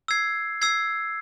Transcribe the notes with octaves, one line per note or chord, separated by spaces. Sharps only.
E6 G#6 C7
E6 G#6 C7